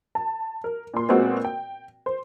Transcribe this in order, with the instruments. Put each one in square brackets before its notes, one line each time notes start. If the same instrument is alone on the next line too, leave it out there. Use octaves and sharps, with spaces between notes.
[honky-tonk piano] A5
A#4
A#2 C6
A#2 G#3 B3 C4 F#4
G5
C5